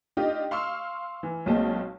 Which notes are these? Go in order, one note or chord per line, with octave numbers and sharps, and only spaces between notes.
D4 D#4 F4 G4 D#5
F5 C6 C#6 E6 F6
E3
B1 A#2 G#3 C4 A5